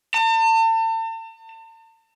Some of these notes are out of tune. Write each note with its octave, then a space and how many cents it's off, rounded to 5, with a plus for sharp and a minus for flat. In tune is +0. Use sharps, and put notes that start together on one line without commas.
A5 +40